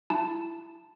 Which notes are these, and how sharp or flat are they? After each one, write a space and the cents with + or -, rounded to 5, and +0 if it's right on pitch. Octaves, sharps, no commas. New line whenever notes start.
E4 +25 A5 +0